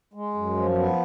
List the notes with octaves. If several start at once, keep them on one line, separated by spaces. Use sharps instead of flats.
G#3
F#2
F3
B3